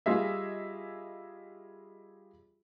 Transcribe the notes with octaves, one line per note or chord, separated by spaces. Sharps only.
G3 F4 G#4 D#5 E5